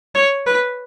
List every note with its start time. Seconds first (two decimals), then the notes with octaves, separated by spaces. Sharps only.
0.15 C#5
0.46 B4